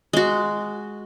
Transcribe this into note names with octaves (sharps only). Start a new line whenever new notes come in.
G#3 F#4